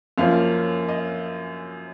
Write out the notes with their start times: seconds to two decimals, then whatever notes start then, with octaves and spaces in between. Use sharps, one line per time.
0.18 F#2 F3 A#3 C#4 F5
0.89 D#5